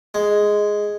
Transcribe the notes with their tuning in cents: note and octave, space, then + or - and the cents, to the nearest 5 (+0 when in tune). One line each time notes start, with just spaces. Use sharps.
G#3 +0